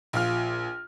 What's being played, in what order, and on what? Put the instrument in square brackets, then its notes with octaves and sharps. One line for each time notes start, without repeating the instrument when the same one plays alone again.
[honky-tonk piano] A#1 F4 F6